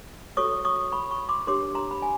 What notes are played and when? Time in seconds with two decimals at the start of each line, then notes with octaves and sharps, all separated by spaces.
0.37 F#4 A4 C#5 C#6 D#6
0.65 C#6 D#6
0.92 B5 C#6
1.11 B5 C#6
1.29 C6 D6
1.47 D4 G4 A#4 C#5 C6 D6
1.75 A#5 C6
1.91 B5
2.02 G#5